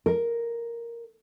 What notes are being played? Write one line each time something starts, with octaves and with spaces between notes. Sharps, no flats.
A#4